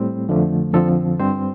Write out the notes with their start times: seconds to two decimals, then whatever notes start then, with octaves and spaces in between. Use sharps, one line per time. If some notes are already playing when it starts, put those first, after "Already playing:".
Already playing: A2 G3 C4
0.29 F2 D3 F3 A3
0.74 F2 D3 F3 C4 A4
1.20 G2 G3 C4 C5